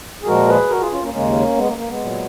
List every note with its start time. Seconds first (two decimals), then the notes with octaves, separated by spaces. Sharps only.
0.23 G#4
0.27 A#2 F3 G#3 F#4 A#4
0.48 G#4 B4
0.70 F#4 A#4
0.80 F4 G#4
0.91 C#4 F4
1.02 A#3 C#4
1.13 D#2 C#3 G#3 A#3 C#4
1.56 G#3 B3
1.67 A#3
1.77 A#3
1.89 G#3 B3
2.00 A#2 F#3